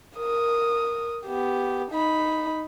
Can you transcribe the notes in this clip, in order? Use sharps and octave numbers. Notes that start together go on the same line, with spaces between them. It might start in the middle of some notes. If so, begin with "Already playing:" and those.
A#4 D#6
B3 G4
D#4 B5